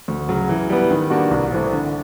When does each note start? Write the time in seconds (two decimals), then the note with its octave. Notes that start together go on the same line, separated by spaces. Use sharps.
0.08 D2
0.29 C#3 F#3
0.49 E3
0.70 G3 B3
0.91 D#3
1.10 G3 A#3 D4 F#4
1.31 C2
1.52 C3 E3 A3 C4
1.72 D3